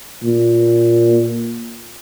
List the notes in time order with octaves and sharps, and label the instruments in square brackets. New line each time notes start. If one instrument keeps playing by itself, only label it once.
[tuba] A#2